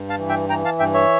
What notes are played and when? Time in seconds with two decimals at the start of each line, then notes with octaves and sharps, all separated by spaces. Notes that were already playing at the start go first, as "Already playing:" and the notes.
Already playing: G2
0.09 F5 A5
0.19 E3
0.29 E5 G5
0.49 E3 G5 A#5
0.65 F5 A5
0.79 G2 E5 G5
0.94 C#5 E5